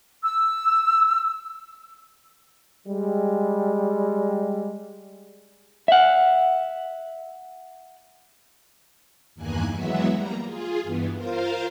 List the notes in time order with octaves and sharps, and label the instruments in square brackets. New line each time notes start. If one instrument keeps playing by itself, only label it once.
[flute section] E6
[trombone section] G3 G#3
[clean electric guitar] E5 F#5
[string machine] E2 G2 D#3 A#3 G#5 F#6
E3 F#3 G#3 B3 F#4 E5
G3 A#3 A#5
F4 G#4
G2 E3 B3
F4 A#4 C5 F5